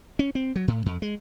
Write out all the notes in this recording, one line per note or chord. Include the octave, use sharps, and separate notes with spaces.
C#4
C4
F#3
A2
F2
G#3